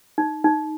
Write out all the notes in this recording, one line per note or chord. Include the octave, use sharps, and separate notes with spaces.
D#4
D#4